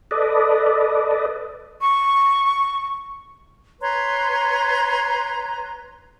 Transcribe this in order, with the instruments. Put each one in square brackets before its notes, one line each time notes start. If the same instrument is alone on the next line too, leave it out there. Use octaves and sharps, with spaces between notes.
[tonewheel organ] A4 B4 D5 D#5
[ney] C#6
[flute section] B4 C#5 A#5 C6